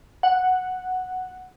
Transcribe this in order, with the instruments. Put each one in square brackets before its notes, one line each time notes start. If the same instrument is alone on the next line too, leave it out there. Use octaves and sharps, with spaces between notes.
[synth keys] F#5